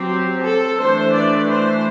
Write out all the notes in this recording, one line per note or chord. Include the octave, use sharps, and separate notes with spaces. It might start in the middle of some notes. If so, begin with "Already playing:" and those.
Already playing: F#3 C4 G4
A4
E3 A3 D4 C5
D5
C5